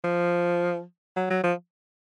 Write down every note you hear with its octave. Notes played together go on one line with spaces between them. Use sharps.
F3
F#3
F#3
F3